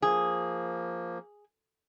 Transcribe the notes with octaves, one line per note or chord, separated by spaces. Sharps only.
F3 A#3 G#4